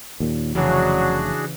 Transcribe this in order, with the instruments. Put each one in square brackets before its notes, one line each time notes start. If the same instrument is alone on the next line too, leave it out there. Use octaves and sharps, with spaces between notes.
[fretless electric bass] D#2 A#2
[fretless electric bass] F1 [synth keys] C#3 E3 [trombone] F#3 [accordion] D4 F#4 G#4